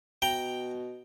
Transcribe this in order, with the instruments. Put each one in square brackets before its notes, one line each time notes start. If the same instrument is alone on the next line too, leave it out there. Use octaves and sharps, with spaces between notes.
[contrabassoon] B2 [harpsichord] G5 A#5